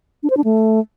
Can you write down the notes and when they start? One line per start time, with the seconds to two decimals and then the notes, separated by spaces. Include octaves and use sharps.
0.23 D4
0.30 C5
0.37 D4
0.44 A3